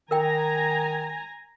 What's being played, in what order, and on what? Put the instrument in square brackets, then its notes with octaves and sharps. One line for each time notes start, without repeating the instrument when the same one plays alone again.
[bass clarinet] D#3 [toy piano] A#4 G5 [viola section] G#5 A#5